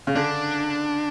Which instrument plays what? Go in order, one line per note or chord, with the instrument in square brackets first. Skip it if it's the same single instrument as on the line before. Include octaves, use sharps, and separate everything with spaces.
[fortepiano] C#3
[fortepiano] D3 [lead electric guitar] D4